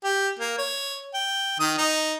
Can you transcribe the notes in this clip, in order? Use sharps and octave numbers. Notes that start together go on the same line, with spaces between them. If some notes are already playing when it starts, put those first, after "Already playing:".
G4
A#3
C#5
G5
D#3 D#6
D#4